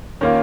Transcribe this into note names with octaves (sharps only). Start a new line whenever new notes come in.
D#3 A#3 C#4 F4